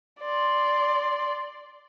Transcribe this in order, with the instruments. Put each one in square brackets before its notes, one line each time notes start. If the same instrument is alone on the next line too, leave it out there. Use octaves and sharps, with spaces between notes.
[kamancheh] D5 C6